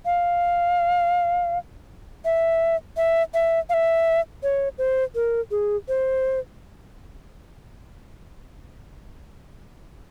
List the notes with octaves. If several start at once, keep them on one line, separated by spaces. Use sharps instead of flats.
F5
E5
E5
E5
F5
E5
C#5
C5
A#4
G#4
C5